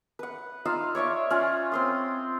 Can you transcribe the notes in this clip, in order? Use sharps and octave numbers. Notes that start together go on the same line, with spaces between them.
B4 F#5
D#4 F4 F5 E6
C#5 D5 E5 C#6
C#4 F4 F#5
C4 C6 D#6